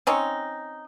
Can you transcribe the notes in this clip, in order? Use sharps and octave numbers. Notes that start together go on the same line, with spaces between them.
C4 C#4 D#4